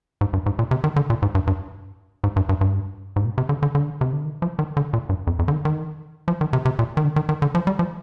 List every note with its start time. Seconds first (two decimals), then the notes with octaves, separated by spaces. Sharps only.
0.21 G#2
0.33 G2
0.46 G#2
0.59 A#2
0.71 C3
0.84 D#3
0.96 D3
1.10 A#2
1.22 G#2
1.35 G2
1.47 G2
2.24 G#2
2.36 G2
2.49 G2
2.61 G2
3.16 G#2
3.25 A#2
3.38 C3
3.49 D3
3.63 D3
3.75 D3
4.01 C3
4.13 D3
4.25 D#3
4.42 F3
4.59 D#3
4.77 D3
4.93 A#2
5.09 G2
5.27 F2
5.39 F2
5.48 D3
5.52 D#3
5.65 D#3
6.28 F3
6.41 D#3
6.53 C3
6.65 C3
6.79 A#2
6.97 D#3
7.04 D3
7.16 D#3
7.29 D#3
7.42 D3
7.55 F3
7.67 G3
7.79 F3